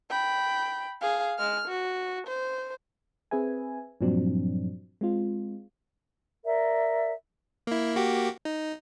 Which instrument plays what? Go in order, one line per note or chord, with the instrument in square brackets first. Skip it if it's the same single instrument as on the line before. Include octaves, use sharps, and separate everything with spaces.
[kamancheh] G5 B5
G#4 F5
G#3 F6
F#4
C5
[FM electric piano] C4 G#4 B4 E5 G#5
G2 A#2 F3 F#3 C4 D4
G#3 C4 F4
[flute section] A#4 D5 E5
[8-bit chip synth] A#3 E4
A#3 F#4 G4
D#4